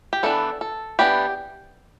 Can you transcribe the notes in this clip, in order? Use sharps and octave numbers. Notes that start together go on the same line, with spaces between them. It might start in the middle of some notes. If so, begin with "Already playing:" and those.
G4
E3 B3 D4 A4
A4
E3 B3 D4 G4